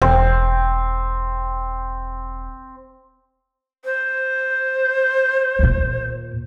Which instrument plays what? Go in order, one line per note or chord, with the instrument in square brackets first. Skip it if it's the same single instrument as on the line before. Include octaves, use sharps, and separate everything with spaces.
[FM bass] E1 [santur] C4
[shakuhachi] C5
[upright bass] D#2 A#2